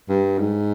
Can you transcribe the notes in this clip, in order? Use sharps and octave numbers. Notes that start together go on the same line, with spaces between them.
G2
G#2